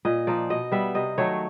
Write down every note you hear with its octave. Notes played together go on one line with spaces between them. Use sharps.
A#2 D#5
F3 A#3 D#4 D5
B2 D#5
G3 B3 E5
C3 D#5
D#3 F#3 A3 C#5